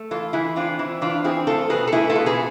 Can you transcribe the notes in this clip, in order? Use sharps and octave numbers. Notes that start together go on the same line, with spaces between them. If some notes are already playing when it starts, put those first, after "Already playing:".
Already playing: A3
E3 F4 A4
E3 E4 G#4
C4 D4 F4
E3 E4
E3 D4 F4
C4 E4 G#4
A3 F4 A4
B2 G#4 B4
A4
A3 E4 G#4
F4 A4
B2
G#4 B4